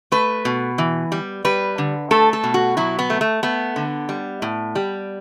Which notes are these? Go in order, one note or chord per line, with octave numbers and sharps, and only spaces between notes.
A3 B4
B2
E3
G3
G3 B4
D3
A3 A4
A4
B2
F#4
F#3 E4
B3
A3
A3
A3 B3
D3
G3
A2
G3